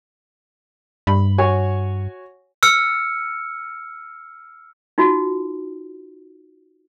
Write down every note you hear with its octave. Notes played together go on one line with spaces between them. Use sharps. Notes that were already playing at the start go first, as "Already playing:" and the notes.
G2 B5
F#4 C#5 G#5
E6 F6 C#7
D#4 F4 F#4